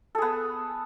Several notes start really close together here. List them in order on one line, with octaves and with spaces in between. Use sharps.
A4 G#4 B3